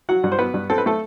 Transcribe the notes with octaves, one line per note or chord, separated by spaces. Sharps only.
F#3 F#4 F#5
G2
C5
F#3 B3 B4
G2
C4 A4
B4
A3 A4